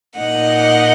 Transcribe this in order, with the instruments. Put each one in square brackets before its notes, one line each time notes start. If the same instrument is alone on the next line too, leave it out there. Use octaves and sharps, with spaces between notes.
[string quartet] A#2 A#3 D#4 D#5 F#5